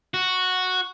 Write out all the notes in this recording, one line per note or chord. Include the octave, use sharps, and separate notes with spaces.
F#4